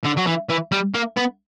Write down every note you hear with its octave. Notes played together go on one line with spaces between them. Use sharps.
D3
F#3
E3
E3
G3
A#3
B3